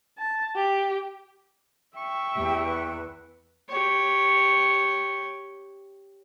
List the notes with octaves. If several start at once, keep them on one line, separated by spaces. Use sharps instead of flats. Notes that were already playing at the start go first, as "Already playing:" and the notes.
A5
G4
E5 G5 C#6
E2 G4
B4
G4 C#5